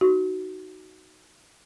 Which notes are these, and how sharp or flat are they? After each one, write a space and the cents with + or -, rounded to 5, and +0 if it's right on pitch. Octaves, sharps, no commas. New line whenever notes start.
D#4 +0 F#4 +10